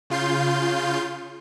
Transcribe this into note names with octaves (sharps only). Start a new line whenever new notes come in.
C#3 F4 C6 G6